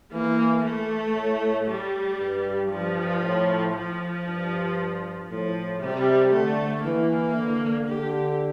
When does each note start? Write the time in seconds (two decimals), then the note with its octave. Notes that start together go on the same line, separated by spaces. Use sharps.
0.13 E3 A#3
0.64 A3
1.16 A2
1.67 G3
2.19 G2
2.71 F3
3.23 A2
3.74 F3
4.26 G2
5.29 A2 F3
5.81 C3 G3
6.32 D3 A3
6.84 E3 A#3
7.36 D3
7.88 D3 G4